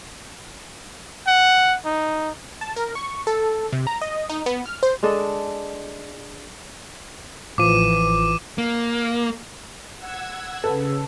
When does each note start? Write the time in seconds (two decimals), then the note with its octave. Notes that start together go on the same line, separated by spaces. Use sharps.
1.27 F#5
1.85 D#4
2.61 A5
2.76 A#4
2.95 C#6
3.27 A4
3.73 C3
3.87 A#5
4.01 D#5
4.29 D#4
4.46 B3
4.66 F6
4.83 C5
5.03 G#3 D4 A4 D#5
7.58 A1 E3 F3 D6 D#7
8.58 A#3
9.98 F#5 E6 G#6
10.64 C#3 A4 B4